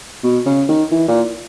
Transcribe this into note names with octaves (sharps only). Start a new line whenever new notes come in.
B2
C#3
D#3
E3
A#2